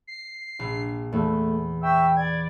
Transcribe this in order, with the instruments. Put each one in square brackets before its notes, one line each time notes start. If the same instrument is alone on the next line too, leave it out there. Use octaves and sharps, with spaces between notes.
[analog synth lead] C7
[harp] A#1
[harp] E2 [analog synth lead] A3
[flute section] E5 C#6 E6 [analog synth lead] G5
[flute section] D5 [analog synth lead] G#6